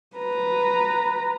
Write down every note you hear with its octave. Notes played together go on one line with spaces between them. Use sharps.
B4 A#5